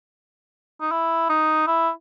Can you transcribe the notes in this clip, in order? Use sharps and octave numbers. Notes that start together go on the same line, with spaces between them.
D#4
E4
D#4
E4